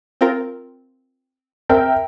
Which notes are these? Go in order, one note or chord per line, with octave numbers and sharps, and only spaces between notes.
C4 F4 A#4
C4 A#4 E5 G5